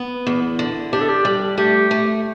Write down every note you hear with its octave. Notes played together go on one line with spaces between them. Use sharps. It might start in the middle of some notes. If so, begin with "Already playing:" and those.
Already playing: B3
E2
D3
D4 G4
A4
G4
G3
A3 G4
A3